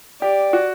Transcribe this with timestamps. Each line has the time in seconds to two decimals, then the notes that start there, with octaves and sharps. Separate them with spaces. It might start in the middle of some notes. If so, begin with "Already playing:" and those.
0.22 G4 D5
0.53 F#4